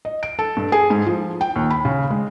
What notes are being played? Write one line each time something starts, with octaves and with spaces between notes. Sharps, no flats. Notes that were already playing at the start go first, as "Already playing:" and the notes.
D#5
D7
A4
G2
G#4
G#2
F3
G5
D#2
B5
C#3
G#3